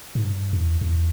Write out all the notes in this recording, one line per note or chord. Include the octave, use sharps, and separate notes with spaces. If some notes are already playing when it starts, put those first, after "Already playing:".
G#2
G2
E2
E2